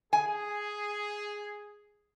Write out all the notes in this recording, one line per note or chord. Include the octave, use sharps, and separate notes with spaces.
G#4 G#5